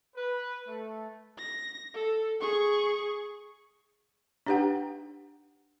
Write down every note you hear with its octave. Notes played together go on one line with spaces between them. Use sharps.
B4
A3
A#6
A4
G#4 C#6
D4 D#4 G4 B4 F#5 G5